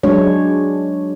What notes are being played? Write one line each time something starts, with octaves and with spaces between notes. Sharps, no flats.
F#3 G#3 D4 C#5